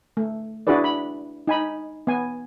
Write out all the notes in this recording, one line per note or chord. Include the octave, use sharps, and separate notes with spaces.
A3
D4 E4 F#4 G#4 B4 D5
B5
D#4 G#5 B5
B3 G#5